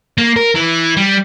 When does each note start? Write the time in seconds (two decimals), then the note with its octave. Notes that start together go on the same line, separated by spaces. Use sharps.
0.18 A#3
0.36 A#4
0.55 E3
0.97 G3